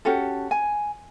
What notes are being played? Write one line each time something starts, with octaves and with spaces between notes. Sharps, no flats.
C#4 F#4 G4 A4
G#5